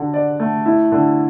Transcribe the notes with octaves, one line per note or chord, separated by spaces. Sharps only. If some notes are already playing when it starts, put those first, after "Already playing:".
Already playing: D3 F#4
D5
A3
E4
D3